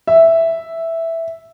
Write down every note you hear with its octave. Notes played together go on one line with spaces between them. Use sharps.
E5